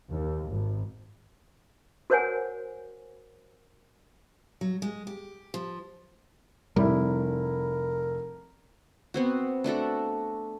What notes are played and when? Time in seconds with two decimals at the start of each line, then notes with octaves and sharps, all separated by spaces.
0.11 D#2
0.50 G#1
2.10 F#4 A#4 C5 C#5 F#5 G#5
4.61 F#3
4.82 G#3
5.07 G4
5.54 F3
6.76 F1 G3 E4 A#4
9.14 B3 C4 F#4
9.64 A3 D4 F#4 A4